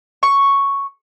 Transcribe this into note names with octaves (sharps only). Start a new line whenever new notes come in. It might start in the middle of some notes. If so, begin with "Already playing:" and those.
C#6